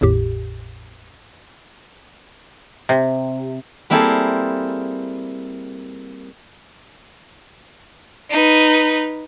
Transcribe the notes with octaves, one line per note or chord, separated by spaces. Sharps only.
G#1 E2 A2 G4
C3
G3 A#3 C4 E4 G#4 A4
D#4 B4